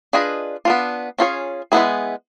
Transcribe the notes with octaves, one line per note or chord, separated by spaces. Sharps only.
D4 F4 G#4 B4 D#5
B3 D4 F4
C#4 F4 G#4 C#5
G#3 B3 E4 G#4